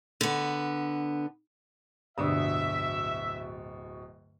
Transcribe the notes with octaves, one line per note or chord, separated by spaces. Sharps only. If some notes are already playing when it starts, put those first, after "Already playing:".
D3 B3
D1 G2 B2 D3 D4 E5 D#6